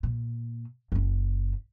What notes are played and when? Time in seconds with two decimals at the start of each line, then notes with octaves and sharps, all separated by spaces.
0.03 A#2
0.92 F#1 C#4